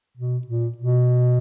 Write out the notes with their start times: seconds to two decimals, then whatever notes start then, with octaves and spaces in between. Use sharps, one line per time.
0.17 B2
0.47 A#2
0.77 B2